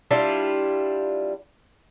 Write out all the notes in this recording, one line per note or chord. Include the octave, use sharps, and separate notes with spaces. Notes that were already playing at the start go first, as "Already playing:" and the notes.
G3 D4 E4 F4